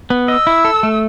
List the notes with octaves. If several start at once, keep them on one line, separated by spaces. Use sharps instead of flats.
B3
D#5 E6
E4
A4
A3